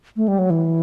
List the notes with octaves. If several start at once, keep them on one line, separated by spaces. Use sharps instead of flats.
A3
G3
F#3
E3